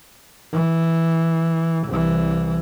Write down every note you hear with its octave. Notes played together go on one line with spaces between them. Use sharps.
E3
C2 E3